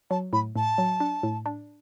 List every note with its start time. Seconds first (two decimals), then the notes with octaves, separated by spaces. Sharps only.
0.10 F#3 A5
0.33 A2 B5
0.56 A2 A5
0.78 F#3
1.00 D4
1.23 A2
1.46 D4